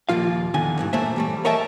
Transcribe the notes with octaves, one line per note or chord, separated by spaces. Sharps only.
D#2 A#2 F3 F4 F5
E2 D3 D#3 G#5
G2 B2 E3
A#2 A3 A#3 C5 E5
E3 G3 A3
A#4 C#5 D#5 E5 G5 A5